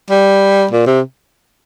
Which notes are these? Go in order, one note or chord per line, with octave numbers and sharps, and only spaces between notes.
G3
A#2
C3